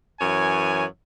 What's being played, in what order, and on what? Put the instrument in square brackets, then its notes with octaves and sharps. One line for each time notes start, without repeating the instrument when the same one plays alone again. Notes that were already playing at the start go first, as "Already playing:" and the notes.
[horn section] F#2 E3 C#5 G#5